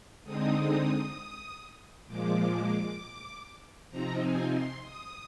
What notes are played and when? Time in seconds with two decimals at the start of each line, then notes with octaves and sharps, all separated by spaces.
0.24 D3 G#3 C4 D#4 D#6
2.07 A#2 F3 G#3 D6
3.90 C3 F3 C4 D#4 A#5
4.22 G#5
4.53 C6
4.83 D#6